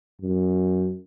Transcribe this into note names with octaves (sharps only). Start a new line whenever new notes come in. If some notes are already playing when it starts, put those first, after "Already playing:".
F#2